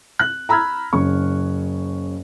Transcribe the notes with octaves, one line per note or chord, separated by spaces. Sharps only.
F#6
A#5 B5 E6 F6 G#6
F#1 C#3 C#6